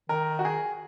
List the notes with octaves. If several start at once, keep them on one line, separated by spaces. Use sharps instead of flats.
D#3 A#4
F#4
G#4